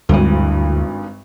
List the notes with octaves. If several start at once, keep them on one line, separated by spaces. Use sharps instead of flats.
G#1 D2 G2 E3